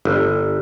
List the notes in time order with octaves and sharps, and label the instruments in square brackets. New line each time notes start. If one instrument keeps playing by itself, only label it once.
[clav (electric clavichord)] G1